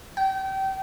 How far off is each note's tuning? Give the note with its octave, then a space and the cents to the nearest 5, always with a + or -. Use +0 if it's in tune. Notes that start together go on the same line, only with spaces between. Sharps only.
G5 -30